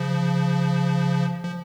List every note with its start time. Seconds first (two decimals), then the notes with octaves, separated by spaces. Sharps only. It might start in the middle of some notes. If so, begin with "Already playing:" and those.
Already playing: C#3 F3
1.44 F3